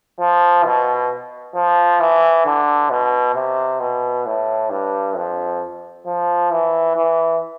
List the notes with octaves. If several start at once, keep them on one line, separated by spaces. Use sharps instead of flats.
F3
B2
F3
E3
D3
B2
C3
B2
A2
G2
F2
F3
E3
E3